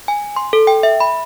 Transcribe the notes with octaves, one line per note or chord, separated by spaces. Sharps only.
G#5
C6
A4
G5
E5
B5